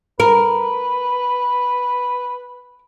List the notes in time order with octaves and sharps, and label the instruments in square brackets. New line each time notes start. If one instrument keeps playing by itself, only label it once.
[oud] A#4 [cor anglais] B4